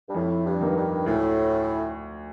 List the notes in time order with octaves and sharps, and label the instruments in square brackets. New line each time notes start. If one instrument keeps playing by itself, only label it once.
[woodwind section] G2
[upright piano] F2 [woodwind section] A2
[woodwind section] G2
[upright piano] D#3 A#3 D#4
[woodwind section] G2
[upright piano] D2 [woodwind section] A2